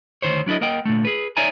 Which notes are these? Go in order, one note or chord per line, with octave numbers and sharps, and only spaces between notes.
D2 A#2 D#3 C5 C#5
F#3 D4 E4 A4 D#5
A#3 A#4 D#5 F#5 G5
A#2 D3 A3
G#4 B4
D#4 C#5 D5 E5 G#5 A#5